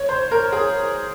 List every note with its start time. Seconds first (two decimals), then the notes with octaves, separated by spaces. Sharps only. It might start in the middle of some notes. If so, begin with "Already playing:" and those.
Already playing: C#5
0.09 C5
0.31 A#4
0.52 G#4